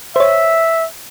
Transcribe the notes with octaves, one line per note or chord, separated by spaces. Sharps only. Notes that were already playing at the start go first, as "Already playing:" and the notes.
C5 C#5 E5